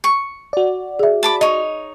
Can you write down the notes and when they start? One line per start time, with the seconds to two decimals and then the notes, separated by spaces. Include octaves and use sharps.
0.04 C#6
0.53 F#4 D5
0.99 G#4 E5
1.23 A5 B5 D6
1.41 D#4 C#5 D#5